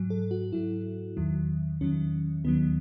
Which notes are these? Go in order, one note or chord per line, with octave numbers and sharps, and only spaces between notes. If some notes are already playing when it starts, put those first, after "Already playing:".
Already playing: G#2 F#3
A4
F#4
G#2 F#3 E4
E2 D#3 F#3
E2 D#3 F#3 C#4
D#2 D#3 F#3 B3